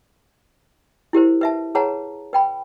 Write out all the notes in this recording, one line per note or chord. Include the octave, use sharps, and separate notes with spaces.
E4 G4 A#4 C5
B4 E5 A5
G#4 B4 C#5 F#5 A5 A#5
B4 G5 B5